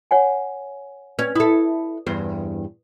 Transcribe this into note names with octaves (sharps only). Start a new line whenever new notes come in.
C#5 F#5 G#5
C#4 B4 D5
E4 A4 D#6
E2 G2 C5